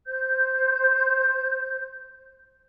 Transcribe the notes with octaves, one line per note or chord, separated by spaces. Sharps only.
C5 G6